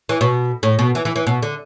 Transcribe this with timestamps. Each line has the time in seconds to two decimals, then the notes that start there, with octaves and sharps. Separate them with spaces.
0.09 E3
0.21 B2
0.63 A2
0.79 B2
0.95 E3
1.05 E3
1.16 E3
1.27 B2
1.43 D3